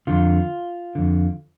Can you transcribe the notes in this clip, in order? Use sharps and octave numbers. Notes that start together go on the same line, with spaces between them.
F2 D3 F4
F2 D3